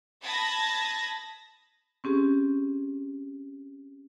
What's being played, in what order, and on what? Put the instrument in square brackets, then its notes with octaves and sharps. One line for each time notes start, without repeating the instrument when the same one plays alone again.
[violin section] A5 B5 D#6 G#6 A#6
[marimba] C4 C#4 G4 G#4